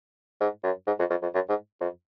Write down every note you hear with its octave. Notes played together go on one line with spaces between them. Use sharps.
G#2
F#2
G#2
F2
F2
F2
F#2
G#2
F2